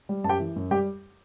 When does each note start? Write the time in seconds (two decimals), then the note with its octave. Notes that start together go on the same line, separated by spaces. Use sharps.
0.09 G3
0.24 F#2 A5
0.29 G4 G5
0.39 E3
0.56 F#2
0.71 G3 G4 G5